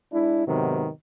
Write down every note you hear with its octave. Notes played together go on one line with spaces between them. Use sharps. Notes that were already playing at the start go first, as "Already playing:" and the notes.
G#3 D4 E4
G#2 C3 D#3 F#3 B3